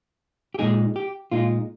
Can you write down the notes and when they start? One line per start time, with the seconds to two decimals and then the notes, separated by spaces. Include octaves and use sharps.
0.54 G4
0.59 A#2 G#3 D#4 G#4
0.96 G4
1.32 A#2 G#3 D#4 F4